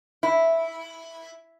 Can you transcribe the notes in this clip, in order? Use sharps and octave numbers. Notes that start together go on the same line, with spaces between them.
E4